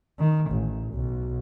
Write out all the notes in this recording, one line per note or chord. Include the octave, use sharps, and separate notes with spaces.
D#3
A1
B1